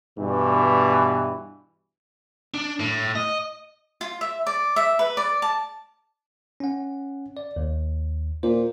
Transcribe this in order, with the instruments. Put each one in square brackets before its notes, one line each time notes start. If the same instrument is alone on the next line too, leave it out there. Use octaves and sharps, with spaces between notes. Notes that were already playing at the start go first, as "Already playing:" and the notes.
[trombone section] G2 B2 E3
[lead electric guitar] D4
A2
D#5
[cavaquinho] F4
E5
D5
E5
B4
D5
A5
[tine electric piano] C#4 F#5
D5
D#2
[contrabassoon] A#2 [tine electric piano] C5